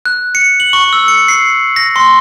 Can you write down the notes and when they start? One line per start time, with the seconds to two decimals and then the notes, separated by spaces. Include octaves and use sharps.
0.05 F#6
0.35 C#7
0.60 F#7
0.73 C#6
0.93 E6
1.08 C#7
1.28 C7
1.76 A#6
1.96 C6